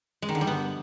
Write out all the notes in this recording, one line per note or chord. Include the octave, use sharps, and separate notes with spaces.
G#3
D#3
D3
G3
B3